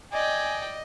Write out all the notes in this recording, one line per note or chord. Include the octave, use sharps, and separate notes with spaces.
D5 D#5 G5 G#5